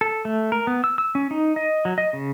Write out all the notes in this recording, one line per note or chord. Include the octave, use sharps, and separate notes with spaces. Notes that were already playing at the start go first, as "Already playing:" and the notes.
A4
A3
A#4
B3
E6
E6
C#4
D#4
D#5
F#3
D#5
C#3